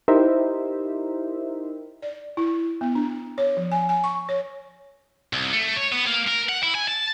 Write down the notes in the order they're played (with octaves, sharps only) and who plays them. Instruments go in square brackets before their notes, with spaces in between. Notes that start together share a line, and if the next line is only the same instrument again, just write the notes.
[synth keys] D#4 E4 G4 A#4 C5 E5
[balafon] D5
E4
B3
D4
C#5
F3
G#5
G#5
C#6
C#5
[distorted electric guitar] C2
A3
C#5
B3
A#3
A#4
F#5
E4
G#5
A5